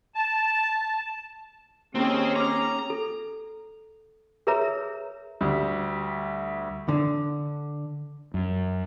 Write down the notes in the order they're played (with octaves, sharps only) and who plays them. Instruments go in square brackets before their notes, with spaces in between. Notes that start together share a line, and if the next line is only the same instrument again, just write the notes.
[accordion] A5
[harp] D#2 [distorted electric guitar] C4 [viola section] C#4 G#4
[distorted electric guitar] A#5 [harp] D6 F6
[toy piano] A4
G#4 A#4 B4 C#5 E5 A#5
[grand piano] D2 G3
[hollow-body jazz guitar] D3
[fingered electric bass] F#2